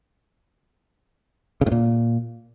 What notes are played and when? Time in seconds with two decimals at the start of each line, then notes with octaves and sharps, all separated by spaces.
1.61 C#3
1.66 A2
1.72 A#2